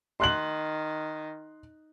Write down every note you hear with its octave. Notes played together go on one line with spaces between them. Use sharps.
D#3 C6 F#6 F#7